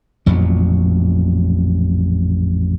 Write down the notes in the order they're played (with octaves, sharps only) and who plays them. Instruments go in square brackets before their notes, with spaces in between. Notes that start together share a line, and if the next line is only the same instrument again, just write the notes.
[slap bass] A1 F2 A#2 F#3